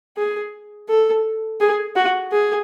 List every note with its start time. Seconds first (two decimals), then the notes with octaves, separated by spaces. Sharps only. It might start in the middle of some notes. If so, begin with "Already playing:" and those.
0.17 G#4
0.89 A4
1.60 G#4
1.96 F#4
2.32 G#4